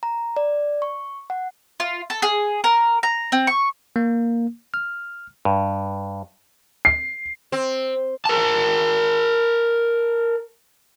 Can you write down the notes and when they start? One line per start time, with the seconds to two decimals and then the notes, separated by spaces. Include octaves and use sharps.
0.03 A#5
0.37 D5
0.82 C#6
1.30 F#5
1.80 F4
2.10 A4
2.22 G#4
2.64 A#4
3.03 A#5
3.32 C4
3.47 C#6
3.96 A#3
4.74 F6
5.45 G2
6.85 C7
7.52 C4
8.25 A#4 A5